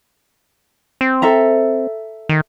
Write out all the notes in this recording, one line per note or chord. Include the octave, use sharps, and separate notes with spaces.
C4
A4 E5 A#5
D#3